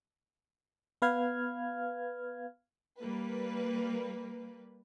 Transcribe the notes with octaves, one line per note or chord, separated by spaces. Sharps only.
B3 B4 F5 F6 G#6
G3 A#3 B4